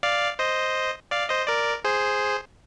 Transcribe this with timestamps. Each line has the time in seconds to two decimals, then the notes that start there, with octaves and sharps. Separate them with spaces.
0.03 D5 F5
0.39 C5 D#5
1.11 D5 F5
1.29 C5 D#5
1.47 A#4 D5
1.84 G#4 C5